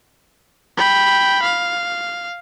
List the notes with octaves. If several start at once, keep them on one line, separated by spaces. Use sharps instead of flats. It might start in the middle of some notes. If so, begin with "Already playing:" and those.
G5 B5
F5